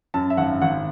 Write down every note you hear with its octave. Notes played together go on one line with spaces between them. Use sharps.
F#2 A5
E5
G#1 F#5
G#1 F#5